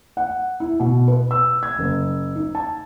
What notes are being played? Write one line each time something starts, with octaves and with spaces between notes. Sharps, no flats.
F#5
E4
B2
B4
E6
G#6
F#1
D#4
A5